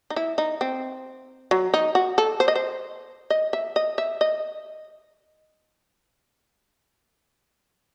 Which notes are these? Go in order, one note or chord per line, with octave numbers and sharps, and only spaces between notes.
D#4
E4
D#4
C4
F#3
D#4
F#4
A4
C5
D#5
C5
D#5
E5
D#5
E5
D#5